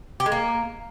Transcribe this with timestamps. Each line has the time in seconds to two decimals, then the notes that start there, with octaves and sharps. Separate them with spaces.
0.20 G4
0.26 G#3
0.32 A#3